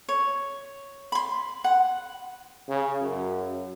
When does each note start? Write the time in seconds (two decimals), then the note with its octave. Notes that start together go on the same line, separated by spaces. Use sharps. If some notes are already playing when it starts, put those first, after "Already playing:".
0.09 C#5
1.12 B5 C6
1.64 F#5
2.69 C#3
3.01 F#2